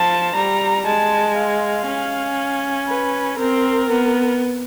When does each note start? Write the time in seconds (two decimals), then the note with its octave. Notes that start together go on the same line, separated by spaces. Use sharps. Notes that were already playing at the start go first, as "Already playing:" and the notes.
Already playing: F3 A5
0.35 G3 A#5
0.86 G#3 A5
1.37 F5
1.87 C#4
2.88 B4
3.38 C4 A#4
3.89 B3